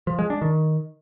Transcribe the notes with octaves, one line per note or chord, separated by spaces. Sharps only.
F3
G#3
D4
D#3